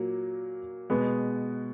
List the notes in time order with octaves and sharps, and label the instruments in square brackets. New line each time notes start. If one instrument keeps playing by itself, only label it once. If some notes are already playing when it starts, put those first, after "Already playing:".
Already playing: [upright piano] A#2 F#3 A#3
B2 G#3 B3